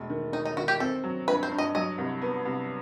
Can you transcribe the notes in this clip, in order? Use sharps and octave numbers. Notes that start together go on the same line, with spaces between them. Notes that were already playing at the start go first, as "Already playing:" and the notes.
Already playing: E1 A3
D#3
D#3 D#4
D#4
D#3 F#4
G4
C4 A4
F#3
G2 B4
C5
G2
D#5
F#3 D#5
C2
B3
C2